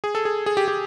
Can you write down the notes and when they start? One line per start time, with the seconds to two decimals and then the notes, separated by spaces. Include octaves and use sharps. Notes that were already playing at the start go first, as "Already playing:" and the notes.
0.04 G#4
0.15 A4
0.25 G#4
0.46 G#4
0.57 G4
0.68 G4